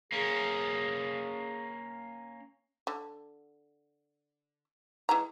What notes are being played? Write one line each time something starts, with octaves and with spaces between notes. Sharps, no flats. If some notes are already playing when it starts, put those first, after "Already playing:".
A#3 C#4 G#4
D3
E3 G#3 A#5